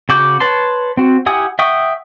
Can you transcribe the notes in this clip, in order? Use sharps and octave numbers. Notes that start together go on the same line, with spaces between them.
C#3 F#4 D6 G6
B4 C#5 A5 C6
C4 F#4
E4 G4 F#5 G#5 D#6
E5 F#5 G5 C#6 D#6